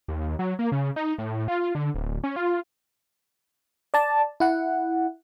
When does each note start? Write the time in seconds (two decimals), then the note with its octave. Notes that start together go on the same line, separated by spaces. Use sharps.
0.08 D#2
0.39 F#3
0.59 A#3
0.72 C#3
0.96 D#4
1.18 A2
1.48 F4
1.75 D3
1.95 D1
2.24 C#4
2.36 F4
3.94 D5 A5
4.40 E4 F#5